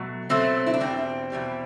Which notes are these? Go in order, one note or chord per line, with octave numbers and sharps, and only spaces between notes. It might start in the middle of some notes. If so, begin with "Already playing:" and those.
Already playing: B2 F#3 A3
B2 F#3 A3 C4
E4
D4
E2 B2 G3 C4
E2 B2 G3